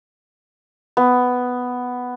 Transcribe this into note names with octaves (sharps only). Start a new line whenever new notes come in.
B3